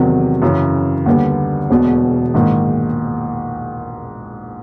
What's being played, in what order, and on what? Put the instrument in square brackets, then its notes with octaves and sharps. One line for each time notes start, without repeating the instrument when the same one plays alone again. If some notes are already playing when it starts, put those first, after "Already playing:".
Already playing: [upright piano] E2 C3 D#3 F#3
F#2 C#3 E3
D#2 D3 G3 B3
E1 E2 B2
A#1 G#2 D#3